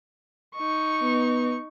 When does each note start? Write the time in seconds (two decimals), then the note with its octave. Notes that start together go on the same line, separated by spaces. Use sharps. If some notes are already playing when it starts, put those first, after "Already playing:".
0.56 D#4 C#6
1.01 B3